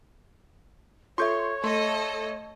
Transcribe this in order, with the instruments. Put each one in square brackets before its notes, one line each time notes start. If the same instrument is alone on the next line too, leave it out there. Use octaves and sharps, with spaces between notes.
[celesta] F4 A4 E5 [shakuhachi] C#5 [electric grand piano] C6 C#6 G6
[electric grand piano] A3 [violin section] A4 D#5 [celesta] C6